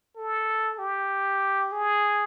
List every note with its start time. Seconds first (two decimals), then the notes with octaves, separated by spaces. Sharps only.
0.17 A4
0.79 G4
1.72 G#4